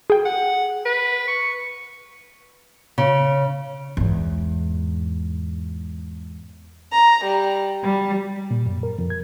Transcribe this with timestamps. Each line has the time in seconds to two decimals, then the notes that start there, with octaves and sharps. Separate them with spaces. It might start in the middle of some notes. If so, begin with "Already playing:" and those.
0.10 G#4 G5
0.25 F#5
0.85 B4
1.28 C#6
2.98 C#3
3.97 E2 G#2
6.92 A#5
7.24 G3
7.84 G3
8.51 A#2
8.66 F#2
8.83 A#4
8.98 F2
9.10 G#6